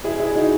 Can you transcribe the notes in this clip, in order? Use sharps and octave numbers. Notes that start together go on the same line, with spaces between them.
E4 G#4
E4 G#4
D#4 F#4